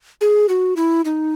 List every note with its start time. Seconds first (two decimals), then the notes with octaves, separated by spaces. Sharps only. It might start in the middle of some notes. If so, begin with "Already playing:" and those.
0.21 G#4
0.49 F#4
0.76 E4
1.05 D#4